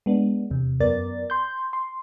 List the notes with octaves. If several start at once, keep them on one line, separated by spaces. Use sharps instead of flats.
G#3 B3 D4
E2 C3
F#2 B3 A#4 D5 A6
C6 G6
C6